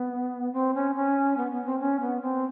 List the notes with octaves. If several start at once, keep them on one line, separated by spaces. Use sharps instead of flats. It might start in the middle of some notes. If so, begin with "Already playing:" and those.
Already playing: B3
C4
C#4
C#4
B3
B3
C4
C#4
B3
C4